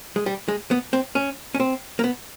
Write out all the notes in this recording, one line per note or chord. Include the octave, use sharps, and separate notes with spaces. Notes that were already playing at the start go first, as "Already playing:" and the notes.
G#3
G3
G#3
B3
C4
C#4
C#4
C4
A#3
B3